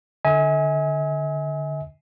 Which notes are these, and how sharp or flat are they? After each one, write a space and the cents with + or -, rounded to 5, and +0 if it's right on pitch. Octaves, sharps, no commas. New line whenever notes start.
D3 +0 E5 -45 G#5 +0